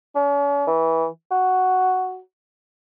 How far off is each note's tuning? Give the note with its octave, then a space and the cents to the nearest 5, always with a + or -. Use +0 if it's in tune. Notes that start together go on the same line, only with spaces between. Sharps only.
C#4 +45
E3 -20
F#4 +5